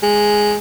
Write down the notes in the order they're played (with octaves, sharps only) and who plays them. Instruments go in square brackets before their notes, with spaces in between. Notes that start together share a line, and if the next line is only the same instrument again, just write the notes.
[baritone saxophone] G#3